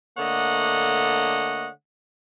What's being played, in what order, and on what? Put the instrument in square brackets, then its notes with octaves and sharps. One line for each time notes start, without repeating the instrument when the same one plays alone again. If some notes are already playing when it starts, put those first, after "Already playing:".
[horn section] D3 A3 A#3 C#5 D#5 F#5